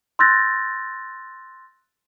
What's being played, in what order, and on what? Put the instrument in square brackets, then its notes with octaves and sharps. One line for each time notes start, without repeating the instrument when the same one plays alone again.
[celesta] C6 E6 F#6 G6 A6 A#6